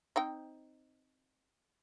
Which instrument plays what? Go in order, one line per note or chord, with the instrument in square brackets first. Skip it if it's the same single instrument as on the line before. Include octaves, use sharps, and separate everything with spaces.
[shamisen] C4 D#4 G5